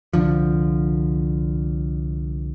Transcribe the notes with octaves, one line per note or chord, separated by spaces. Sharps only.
C2 D3 F3